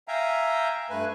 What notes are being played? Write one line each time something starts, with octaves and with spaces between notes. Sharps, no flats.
E5 F5 G5 G#5 A#5
G2 A3 B4 G#5